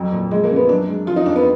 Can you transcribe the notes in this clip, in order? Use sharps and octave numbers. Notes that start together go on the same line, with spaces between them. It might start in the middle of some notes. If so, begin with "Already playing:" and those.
Already playing: F2 F#3
A#2
F3 G#3
A#3
F#2
B3
F#3 D4
G#2
F3 F4
D#4
F2 D4
B3